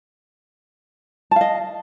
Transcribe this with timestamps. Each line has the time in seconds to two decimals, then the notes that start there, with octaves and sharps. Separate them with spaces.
1.31 A5
1.36 F5
1.41 D#5